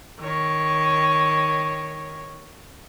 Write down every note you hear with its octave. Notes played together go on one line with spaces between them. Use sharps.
D#3 C#5